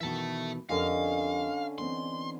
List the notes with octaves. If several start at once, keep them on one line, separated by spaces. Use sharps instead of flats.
B2 D#3 E3 E5 A5
F2 D3 C#4 G4 A#4 D#5 F5
E3 B3 C4 C6